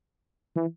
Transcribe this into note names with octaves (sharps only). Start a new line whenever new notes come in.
E3